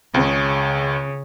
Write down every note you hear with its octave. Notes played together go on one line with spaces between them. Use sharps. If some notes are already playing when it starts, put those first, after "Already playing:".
C#2 C#3